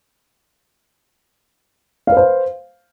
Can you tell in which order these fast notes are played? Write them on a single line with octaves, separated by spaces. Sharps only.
F5 B4 C5